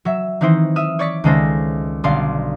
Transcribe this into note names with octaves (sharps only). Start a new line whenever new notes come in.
F#3 E5
D#3 E3 C4 D#4 E4 C5
E5 D#6 F6
C#5 D5 C#6 A6 B6 C#7
C#2 D#3 G#3 A4 C5 A#6
B1 D3 G3 D5 F5 C6